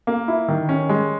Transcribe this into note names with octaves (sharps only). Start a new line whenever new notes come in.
A#3
E4
D#3
C#4
G#3